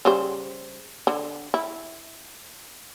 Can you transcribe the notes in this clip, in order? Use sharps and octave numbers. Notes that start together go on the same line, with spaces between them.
C#3 G3 C5
D3
E4